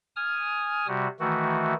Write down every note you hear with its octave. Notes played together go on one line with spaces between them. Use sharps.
G#5 D#6 F6
C3 G3 F#4
D#3 E3 A3 F#4